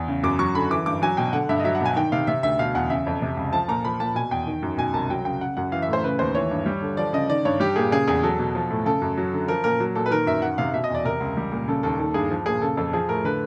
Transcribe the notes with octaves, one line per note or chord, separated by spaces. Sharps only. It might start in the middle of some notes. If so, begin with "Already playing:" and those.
Already playing: E2
C#3
F#2 D6
F#3 C#6
D3 B5
E3 D6
G2 D6
F#3 G#5
B2 G5
D3 F#5
G2 E5
D#5
F#3 E5
F#5
B2 G#5
D#3 G5
C3 F5
C3 E5
D2 E5
B2 F5
E2 F#5
C#3 E5
F2
C3
C#2
F3 A5
A#2 A#5
F3 B5
A#2 A5
B2 G#5
E2 G5
D#3
F#2
B2 G#5
C2 A5
F#3 G5
C#3 G5
C#3 F#5
F#2 F#5
E3 F5
E5
A2
C5
C#3 B4
D#2 C5
E3 C#5
G2
G3
D3
F3 D5
C#3 D#5
D#3 D5
G2 C#5
G3 G4
A#2 G#4
C#3 G#4
E2 G#4
F#3 A4
B2
F3
A2
C#3 A4
F#2
F#3
D3
F3 A#4
A#2 A#4
F#3
A#2 A4
B4
D#3 A#4
F#2 E5
D#3 F#5
C3 F5
B2 E5
D#5
E2 D5
C3 A#4
C#2
G3
A#2
C#3 A4
D#2 A4
D#3 A4
G2 G#4
F3
A#2 G#4
C#3 A4
F2 A4
F3 G#4
A2 A#4
D3 B4